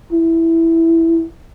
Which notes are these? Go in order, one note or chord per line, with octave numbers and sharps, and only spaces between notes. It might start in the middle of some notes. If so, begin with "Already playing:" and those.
E4